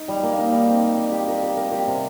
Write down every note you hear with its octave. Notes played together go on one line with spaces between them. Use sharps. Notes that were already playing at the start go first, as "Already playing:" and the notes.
Already playing: D#4
G3
A#3
D#4
G3
C4
G4
G3
G4
A#4
G4
A#4
G4
C3